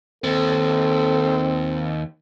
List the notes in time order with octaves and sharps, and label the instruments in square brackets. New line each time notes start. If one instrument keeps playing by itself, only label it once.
[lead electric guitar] D#2 [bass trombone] C4 [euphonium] A4